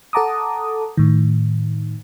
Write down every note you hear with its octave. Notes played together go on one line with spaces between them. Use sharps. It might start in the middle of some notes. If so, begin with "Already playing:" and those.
A4 F#5 A5 A#5 D6 D#6
A2 D#3